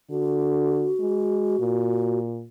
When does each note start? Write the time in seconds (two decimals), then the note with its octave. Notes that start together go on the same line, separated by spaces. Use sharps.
0.11 D3 F#4
1.00 G#3
1.59 A#2